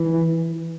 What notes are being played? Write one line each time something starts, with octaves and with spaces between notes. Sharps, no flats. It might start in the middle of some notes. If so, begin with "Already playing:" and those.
Already playing: E3